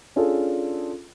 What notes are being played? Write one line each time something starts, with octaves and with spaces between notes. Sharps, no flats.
C#4 D4 F4 G#4 A4